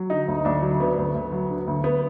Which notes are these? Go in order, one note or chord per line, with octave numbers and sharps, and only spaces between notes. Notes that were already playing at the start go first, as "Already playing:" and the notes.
Already playing: F#3
D3 D#4
D2
D2 D4
F#3
D3 B3
D2
D2
F#3
D3
D2
B3